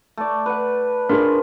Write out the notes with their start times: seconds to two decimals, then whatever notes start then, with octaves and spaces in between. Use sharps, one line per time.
0.17 A3 D5
0.46 B4 F#5
1.09 C#4 D4 F4 G#4 A#4 B4